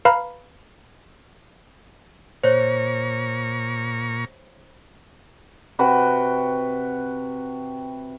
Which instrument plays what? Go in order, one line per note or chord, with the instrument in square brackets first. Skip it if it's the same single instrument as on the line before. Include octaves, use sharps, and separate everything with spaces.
[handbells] B4 F5 A#5 B5 F6
[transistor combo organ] A#2 A#5 C#6 [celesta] C5 C#5
[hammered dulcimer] C3 F#4 B4 G5